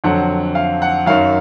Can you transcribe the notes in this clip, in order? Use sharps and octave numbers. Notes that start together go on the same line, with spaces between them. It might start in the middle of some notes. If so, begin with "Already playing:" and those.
F2 D3 F#3 F#5
F5
F#5
F#2 D#3 F#3 F5